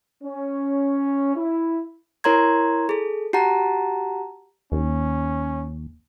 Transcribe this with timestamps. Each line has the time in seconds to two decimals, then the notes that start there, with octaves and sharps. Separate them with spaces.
0.23 C#4
1.36 E4
2.24 E4 A#4 C#5 A#5 C6 G#6
2.89 G#4 A4
3.33 F#4 G4 F#5 A5 A#5
4.72 D#2 C#4